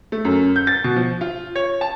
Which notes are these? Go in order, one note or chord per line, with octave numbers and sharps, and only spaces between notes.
A3
F#2
G6
A6
B2
F3
F4
C#5
A5